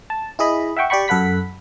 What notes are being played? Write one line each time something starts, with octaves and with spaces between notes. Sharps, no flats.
A5
E4 G#4 D#5 B5
E5 F#5 G5 C#6
G4 D5 G5 B5 C#6
F#2 A4 F#5 B5 B6